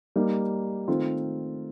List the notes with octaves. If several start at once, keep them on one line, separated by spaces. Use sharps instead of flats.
G3 A#3 D#4
D#3 A3 C4 F4